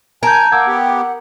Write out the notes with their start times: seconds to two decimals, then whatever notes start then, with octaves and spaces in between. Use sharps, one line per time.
0.23 A#4 G#5 A5 G6
0.52 A#3 F#5 D6 E6 G#6
0.67 B3 G4